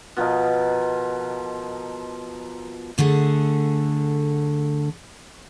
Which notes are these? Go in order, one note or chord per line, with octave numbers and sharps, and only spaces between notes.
B2 F3 A#4 D#5
D2 D3 A3 G#4